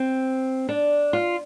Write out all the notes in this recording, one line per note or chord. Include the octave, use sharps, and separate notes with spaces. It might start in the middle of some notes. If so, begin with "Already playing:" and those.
Already playing: C4
D4
F4